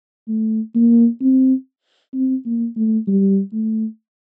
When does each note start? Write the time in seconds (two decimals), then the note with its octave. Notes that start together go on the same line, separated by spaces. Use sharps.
0.28 A3
0.75 A#3
1.21 C4
2.14 C4
2.45 A#3
2.77 A3
3.07 G3
3.53 A3